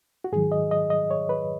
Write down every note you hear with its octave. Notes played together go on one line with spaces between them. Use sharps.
F#4
G#2 D#3 F#3 G#4
D#5
D#5
D#5
C#5
B4